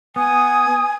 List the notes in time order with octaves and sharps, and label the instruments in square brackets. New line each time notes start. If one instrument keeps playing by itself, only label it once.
[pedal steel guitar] B3 [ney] G#5 [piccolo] D#6